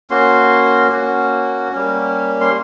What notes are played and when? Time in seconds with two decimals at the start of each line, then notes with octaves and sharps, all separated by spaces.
0.10 A#3 C#4 F#4 C6
0.91 A#3 C#4 F#4
1.72 G3 A#3 C#4
2.41 C6